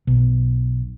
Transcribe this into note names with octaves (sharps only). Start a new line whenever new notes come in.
B1